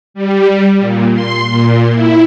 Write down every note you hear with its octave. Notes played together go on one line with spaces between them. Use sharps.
G3
A#2
C6
A#2
E4